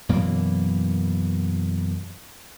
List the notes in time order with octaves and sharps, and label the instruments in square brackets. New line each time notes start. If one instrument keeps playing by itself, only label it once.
[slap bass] F#2 B2 E3 A#3